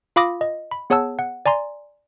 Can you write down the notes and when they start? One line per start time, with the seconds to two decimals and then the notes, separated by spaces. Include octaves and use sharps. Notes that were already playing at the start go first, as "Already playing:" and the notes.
0.16 F4 F5 B5 D6 D#6 A#6
0.41 D#5
0.71 B5
0.90 B3 G#4 C#5 F#5 A5 E6
1.19 F#5
1.46 D5 G#5 A#5 C6